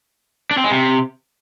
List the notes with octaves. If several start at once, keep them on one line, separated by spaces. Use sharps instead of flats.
D4
C4
G#3
C3